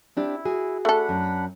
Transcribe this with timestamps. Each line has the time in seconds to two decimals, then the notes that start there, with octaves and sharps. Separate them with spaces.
0.17 C4 D4 E4 G4
0.45 F#4 G#4
0.85 A3 D4 A4 F#5 B5
1.09 F#2